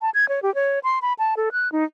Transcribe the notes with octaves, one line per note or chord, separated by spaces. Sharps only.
A5
G#6
C#5
G4
C#5
C6
B5
A5
A4
F#6
D#4